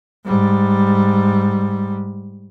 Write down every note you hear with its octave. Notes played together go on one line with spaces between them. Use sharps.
G#2 G3